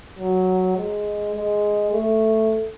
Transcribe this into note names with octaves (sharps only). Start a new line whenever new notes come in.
F#3
G#3
G#3
A3